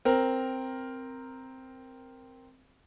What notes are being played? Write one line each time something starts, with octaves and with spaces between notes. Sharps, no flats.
C4 A#4